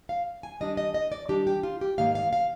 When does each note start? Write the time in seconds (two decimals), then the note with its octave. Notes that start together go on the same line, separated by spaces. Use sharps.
0.09 F5
0.43 G#5
0.60 D#3 G3 D4 D#5
0.77 D#5
0.94 D#5
1.12 D5
1.28 D#3 G3 D4 G4
1.47 G4
1.63 F4
1.81 G4
1.98 G#2 D#3 A#3 F5
2.15 F5
2.33 F5